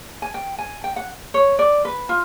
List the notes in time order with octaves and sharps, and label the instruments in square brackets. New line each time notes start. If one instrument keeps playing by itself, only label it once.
[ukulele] G#5
G5
G#5
G5
F#5
C#5
D5
B4
F4